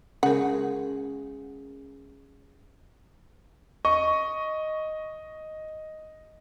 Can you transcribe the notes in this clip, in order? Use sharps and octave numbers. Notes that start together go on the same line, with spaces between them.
C#3 G#3 C#4 A#4 F#5
D#5 C#6